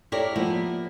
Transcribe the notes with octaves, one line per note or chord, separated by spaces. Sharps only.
E4 G4 A4 A#4 C#5 D5
F3 A#3 B3 E4